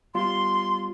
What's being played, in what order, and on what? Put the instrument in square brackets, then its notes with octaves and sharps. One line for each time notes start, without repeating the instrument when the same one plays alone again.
[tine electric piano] G3 B3 F4 [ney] C6